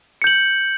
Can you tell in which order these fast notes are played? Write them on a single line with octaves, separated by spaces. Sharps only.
C#7 G6 F#7